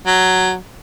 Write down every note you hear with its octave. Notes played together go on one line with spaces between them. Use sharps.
F#3